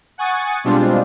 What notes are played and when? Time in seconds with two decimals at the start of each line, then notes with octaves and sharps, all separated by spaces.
0.18 F#5 G#5 C#6 D#6 A6
0.64 B2 G3 G#3 C4 D4 F4